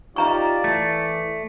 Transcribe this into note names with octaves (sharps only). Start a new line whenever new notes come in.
D#4 F4 G4 D5 E5 A#5 C#6
E3 A3